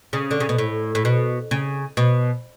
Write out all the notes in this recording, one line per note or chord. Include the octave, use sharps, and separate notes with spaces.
C#3
D3
C#3
B2
A2
A2
B2
C#3
B2